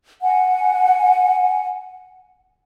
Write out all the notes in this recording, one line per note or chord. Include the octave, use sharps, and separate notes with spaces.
F#5 G#5